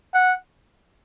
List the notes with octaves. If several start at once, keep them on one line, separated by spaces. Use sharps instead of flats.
F#5